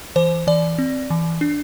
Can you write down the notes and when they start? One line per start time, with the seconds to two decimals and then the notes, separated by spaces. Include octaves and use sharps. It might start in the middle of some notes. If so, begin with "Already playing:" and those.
0.16 E3 C5
0.47 E3 D5
0.78 C4
1.10 E3
1.41 D4